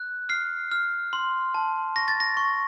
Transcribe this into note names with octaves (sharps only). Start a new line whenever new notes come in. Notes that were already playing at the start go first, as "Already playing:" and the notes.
Already playing: F#6
F6 C7
F6
C6
A5
C#6 A#6
A6
A#6
C#6